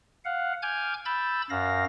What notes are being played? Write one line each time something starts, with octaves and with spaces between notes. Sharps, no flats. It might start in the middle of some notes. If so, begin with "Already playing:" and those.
F5 F#5
G#5 D6 F6 G6 G#6
B5 E6 G6 A6
F#2 F5 A#6